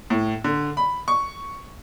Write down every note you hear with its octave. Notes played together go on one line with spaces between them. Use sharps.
A2
D3
B5
C#6